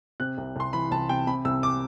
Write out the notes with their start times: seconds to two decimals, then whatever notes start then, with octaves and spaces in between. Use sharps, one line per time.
0.20 C3 F#6
0.38 C2
0.56 C2 C6
0.73 E3 B5
0.91 C2 A5
1.09 C3 G5
1.27 C3 B5
1.45 C2 E6
1.63 D6